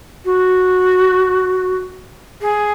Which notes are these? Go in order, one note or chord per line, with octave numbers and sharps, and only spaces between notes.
F#4
G#4